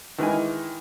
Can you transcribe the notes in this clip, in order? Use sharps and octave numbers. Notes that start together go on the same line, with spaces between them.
D#3 E3 G#3 G#5